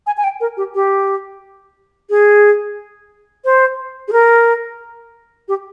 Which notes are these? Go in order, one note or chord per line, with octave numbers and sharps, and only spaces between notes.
G#5
G#5
G5
A#4
G4
G4
G#4
C5
G#4
A#4
G4